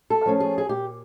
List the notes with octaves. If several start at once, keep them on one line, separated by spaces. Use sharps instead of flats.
A4
F3 A3 C#4 F4
G#4
G#4
A#2 G4